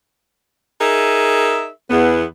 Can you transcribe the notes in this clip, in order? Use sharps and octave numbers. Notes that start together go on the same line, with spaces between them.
D#4 G#4 A#4 E5
E2 B3